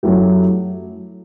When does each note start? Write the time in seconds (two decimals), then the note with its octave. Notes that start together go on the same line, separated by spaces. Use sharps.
0.03 F#2 F#3 A3 E4 G4